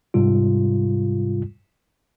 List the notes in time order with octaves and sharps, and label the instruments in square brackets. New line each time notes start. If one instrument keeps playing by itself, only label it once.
[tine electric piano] G#2 C3 G3 F4